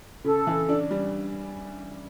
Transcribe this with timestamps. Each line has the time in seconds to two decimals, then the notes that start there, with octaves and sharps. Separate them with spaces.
0.24 C#3 A4
0.47 E3
0.69 D4
0.91 G3